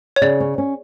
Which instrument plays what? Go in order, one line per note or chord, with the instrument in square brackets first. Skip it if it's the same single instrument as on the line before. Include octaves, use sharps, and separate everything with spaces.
[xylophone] C#5
[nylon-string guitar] C#3 [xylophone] D5
[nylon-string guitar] C#4
C#4